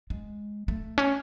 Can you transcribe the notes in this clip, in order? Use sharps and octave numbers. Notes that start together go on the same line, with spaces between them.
G#3
A3
C#4